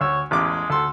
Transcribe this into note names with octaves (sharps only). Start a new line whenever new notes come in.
D2 C#5 E6
A1 E2 G#3 D6
D2 A4 C6